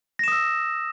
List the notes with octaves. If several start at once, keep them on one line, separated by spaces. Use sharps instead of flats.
D#6 E6 A#6 E7